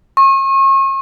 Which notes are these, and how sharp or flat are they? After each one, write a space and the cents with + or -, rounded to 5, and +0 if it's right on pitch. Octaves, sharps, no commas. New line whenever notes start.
C#6 -40